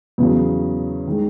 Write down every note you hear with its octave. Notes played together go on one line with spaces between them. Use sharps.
E2 C#3 F#3
D#3 G#3